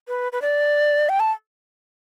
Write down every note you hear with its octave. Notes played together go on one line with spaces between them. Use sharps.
B4
B4
D5
G5
A5